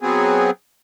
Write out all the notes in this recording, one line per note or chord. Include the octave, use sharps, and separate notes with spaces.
F#3 B3 C4 G#4